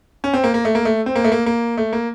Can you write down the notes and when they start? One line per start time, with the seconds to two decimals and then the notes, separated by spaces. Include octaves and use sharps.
0.24 C#4
0.33 C4
0.44 A#3
0.54 A#3
0.65 A3
0.75 A#3
0.85 A3
1.06 C4
1.16 A#3
1.24 A3
1.32 A#3
1.46 A#3
1.77 A3
1.93 A#3